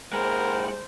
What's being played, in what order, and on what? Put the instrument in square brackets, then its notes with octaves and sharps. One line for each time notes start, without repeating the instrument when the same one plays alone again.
[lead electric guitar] A#2 G#3 [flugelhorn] A#4 [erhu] C5 [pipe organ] F#5 G5 B5